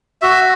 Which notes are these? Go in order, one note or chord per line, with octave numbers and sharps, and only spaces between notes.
F#4 E5